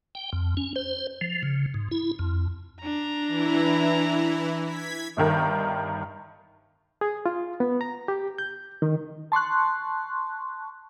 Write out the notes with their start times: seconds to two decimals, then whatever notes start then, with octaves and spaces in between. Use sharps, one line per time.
0.15 G5
0.33 F2
0.57 C#4
0.76 C5
1.21 F3
1.43 C#3
1.74 G#2
1.91 E4
2.19 F2
2.81 D4 A#5
3.28 E3 E4
4.63 G#6 B6
5.17 G1 G2 D#3 A#4
7.01 G#4
7.26 F4
7.60 B3
7.81 A#5
8.08 G4
8.38 G6
8.82 D#3
9.32 A5 C6 C#6 F#6